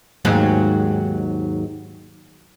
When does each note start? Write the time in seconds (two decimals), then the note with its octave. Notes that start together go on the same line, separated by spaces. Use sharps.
0.25 D#2 G#2 F#3